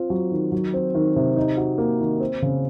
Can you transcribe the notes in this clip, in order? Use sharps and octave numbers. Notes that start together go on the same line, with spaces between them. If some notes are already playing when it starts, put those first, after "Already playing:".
Already playing: C4 F4
F#3
D#3
F#3
C4
D#3
C3
D#4
F#4
A#3
D#3
C4
C#3